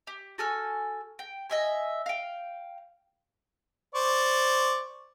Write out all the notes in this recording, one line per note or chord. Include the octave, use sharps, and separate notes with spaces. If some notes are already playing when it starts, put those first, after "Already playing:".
G4
F#4 A4 G#5 F6
G5
D#5 E5 G#5
F5 G5
C5 D5 C#6